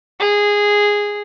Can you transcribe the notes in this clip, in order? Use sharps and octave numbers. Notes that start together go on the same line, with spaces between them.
G#4